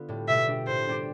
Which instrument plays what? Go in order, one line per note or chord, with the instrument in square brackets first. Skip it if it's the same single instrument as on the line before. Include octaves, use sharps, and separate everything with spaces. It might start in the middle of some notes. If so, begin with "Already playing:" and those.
Already playing: [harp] D3 B3 F4
A2 G3
[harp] B2 [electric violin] E5
[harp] G3 D4 G4
[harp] A2 [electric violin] C5
[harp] G3 D4 G4